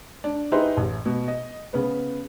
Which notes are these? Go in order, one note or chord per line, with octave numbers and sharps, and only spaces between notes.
D4
D#4 E4 G4 G#4 B4 C5
A1
B2
D#5
C#3 B3 B4